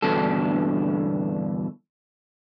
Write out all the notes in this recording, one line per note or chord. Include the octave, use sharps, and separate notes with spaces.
E2 G2 B2 D3 A4